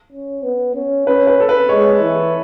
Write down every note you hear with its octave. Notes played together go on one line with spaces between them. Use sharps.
C#4
B3
C#4
C#4 B4
B4
A4
B4
G#3 C#5
E3